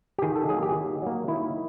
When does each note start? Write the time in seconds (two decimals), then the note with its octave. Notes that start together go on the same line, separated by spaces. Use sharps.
0.18 G4
0.22 D#3 G#4
0.36 A4
0.49 F#3 A#3 G#4
0.63 G4
0.75 D#3
1.02 F#3 A#3
1.28 D#3 E4